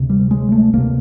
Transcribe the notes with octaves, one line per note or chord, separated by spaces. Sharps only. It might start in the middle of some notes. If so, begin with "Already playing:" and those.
Already playing: D2 C3
G3
G#3
A3
D2 C3 A#3